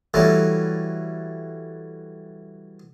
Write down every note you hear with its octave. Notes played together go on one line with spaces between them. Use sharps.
E3 F#3 G3 A3